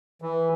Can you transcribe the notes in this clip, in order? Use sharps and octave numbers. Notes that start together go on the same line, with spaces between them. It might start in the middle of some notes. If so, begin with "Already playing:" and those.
E3